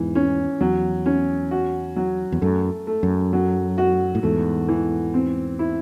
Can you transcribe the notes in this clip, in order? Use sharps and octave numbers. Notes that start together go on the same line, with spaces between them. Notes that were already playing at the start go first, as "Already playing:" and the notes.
Already playing: E2 G#2 E3
C#4
E2 F#3
C#4
F#4
F#3
E2
F#2 A3
A3
F#2
F#3
F#4
A2
E2 G#2 A3
E3
C4
E4